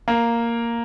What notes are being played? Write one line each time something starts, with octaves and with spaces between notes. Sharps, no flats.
A#3